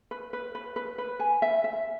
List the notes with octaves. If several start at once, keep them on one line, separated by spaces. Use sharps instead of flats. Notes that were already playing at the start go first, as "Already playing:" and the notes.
B4
B4
B4
B4
B4
G#5
E5
E5